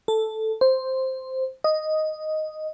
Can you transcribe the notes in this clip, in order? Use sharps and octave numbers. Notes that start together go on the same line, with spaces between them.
A4
C5
D#5